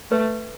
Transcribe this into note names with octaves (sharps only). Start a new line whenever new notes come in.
A3 B4